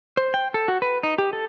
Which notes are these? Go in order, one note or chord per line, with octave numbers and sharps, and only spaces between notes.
C5
G5
A4
F#4
B4
D#4
G4
A4